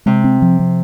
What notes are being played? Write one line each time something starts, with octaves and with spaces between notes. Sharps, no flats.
C3 G#3
C4
F3
F3